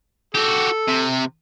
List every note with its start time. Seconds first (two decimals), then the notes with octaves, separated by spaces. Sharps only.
0.35 F#4 G4 A4
0.88 C3